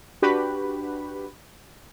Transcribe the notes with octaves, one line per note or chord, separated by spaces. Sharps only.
D4 F#4 G4 B4 B5